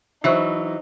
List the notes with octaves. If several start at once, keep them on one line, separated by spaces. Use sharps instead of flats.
E3 F#3 D4 D#4 C5 E5 C#6